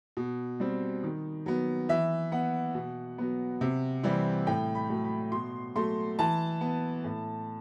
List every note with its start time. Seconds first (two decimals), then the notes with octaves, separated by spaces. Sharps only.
0.17 B2
0.60 G3 C4
1.03 D#3
1.46 F#3 B3
1.89 E3 E5
2.32 B3 F#5
2.75 B2
3.18 F#3 B3
3.61 C3
4.03 E3 G3 C4
4.47 A2 G5
4.75 B5
4.90 F#3 A3
5.04 B5
5.32 B2 C6
5.75 F#3 A3 C6
6.19 E3 A5
6.61 B3
7.04 A2